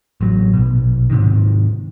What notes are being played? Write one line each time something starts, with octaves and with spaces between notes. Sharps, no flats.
A1 F#3
A#1 B2
G#2 C3 D#3